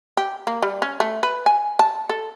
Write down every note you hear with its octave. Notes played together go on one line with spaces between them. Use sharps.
G4
A#3
G3
C#4
A3
B4
G#5
A5
A4